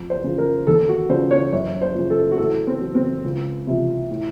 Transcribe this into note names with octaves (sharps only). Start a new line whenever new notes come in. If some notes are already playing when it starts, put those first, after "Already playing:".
Already playing: F2
C5
C#3 F3
A#4
D#2 A4
F#4
C#3 F3 C5
C#5
F#2 C#5
C5
C#3 F3
A4
F#4
A2 A4
C4
F#3
C4
C#2
C3 F3
A2